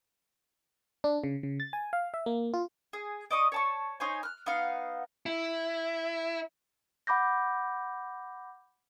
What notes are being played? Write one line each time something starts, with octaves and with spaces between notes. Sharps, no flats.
D4
C#3
C#3
A6
G#5
F5
E5
A#3
F4
G#4
D5 D#5 C#6 D#6
C#5 A5 C#6
D#4 C5 C#5 G#5
F6 F#6
B3 D#4 F5 F#5
E4
F#5 B5 D6 G6 A#6